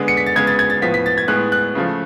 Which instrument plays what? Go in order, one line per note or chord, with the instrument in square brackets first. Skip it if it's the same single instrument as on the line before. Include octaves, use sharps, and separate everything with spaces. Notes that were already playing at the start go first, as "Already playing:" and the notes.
Already playing: [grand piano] D3 G#3 B3
C#7
B6
A6
C#3 G#3 B3 G#6
A6
G#6
A6
A2 F3 B3 B6
B6
A6
G#6
A2 G#3 B3 F#6
F#6
C#3 F3 A3